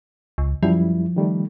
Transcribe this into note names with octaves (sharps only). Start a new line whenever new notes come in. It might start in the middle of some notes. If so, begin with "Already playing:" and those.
C#2
F#2 F3 G3 E4
D#3 G3 A3